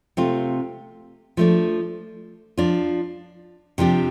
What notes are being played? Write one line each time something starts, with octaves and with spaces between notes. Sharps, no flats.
C3 A3 C4 F4
F3 A3 D4
F3 D4 F4
C3 F3 D4 G4